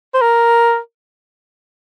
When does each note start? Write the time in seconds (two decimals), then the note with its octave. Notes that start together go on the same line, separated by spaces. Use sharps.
0.14 C5
0.21 A#4